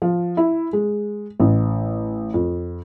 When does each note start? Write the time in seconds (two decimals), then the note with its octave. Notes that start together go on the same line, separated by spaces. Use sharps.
0.02 F3
0.37 E4
0.73 G#3
1.40 A1
2.34 F2